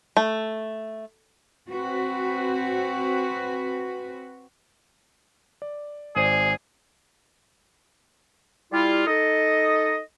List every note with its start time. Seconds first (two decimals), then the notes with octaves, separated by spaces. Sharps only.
0.17 A3
1.69 C4 F#4 B4
5.62 D5
6.16 G#1 G#4 C5 D5
8.72 G3 E4 F4
9.07 D#4 A4 D#5